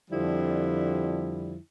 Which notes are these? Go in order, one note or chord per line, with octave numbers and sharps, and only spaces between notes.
F2 D3 F3 G3 E4